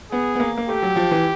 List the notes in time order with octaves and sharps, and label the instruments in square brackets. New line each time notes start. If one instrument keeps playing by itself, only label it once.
[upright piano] B3 [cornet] G#4
[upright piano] B3
A#3
A#3
[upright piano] A3 [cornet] G4
[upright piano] F#3
F3
E3